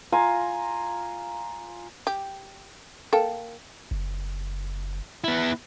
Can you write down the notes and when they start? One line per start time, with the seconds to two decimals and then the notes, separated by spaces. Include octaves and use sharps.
0.12 F4 F5 G#5 A#5
2.07 G4
3.13 A#3 A4 G5
3.91 F#1
5.24 B3 E4